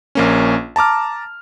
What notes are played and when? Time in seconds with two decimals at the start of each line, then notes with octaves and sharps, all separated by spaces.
0.15 A#1 A#3 C#4
0.76 A5 A#5 D6 F6